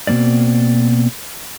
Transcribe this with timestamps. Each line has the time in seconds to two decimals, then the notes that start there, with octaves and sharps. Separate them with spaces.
0.07 B2 F3 A#3 C4 D5